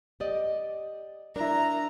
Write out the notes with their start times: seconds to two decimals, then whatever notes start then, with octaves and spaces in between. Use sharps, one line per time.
0.20 G4 D5 D#5
1.36 D4 E4 A#4 A#5